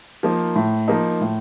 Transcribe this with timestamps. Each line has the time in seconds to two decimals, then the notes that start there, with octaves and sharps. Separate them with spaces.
0.23 F3 A#3 D#4
0.56 A2
0.88 F3 A#3 D#4
1.21 A2